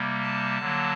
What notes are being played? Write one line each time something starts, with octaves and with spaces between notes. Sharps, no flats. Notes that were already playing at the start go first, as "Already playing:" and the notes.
Already playing: C3 G3 A#3
A5
D3 F#3 A#3